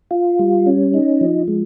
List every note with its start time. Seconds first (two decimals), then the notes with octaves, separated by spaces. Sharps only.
0.11 F4
0.39 G3
0.66 C#4
0.94 D#4
1.21 F3
1.48 G#3